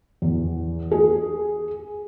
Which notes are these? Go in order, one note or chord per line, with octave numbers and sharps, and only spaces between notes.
E2
G#4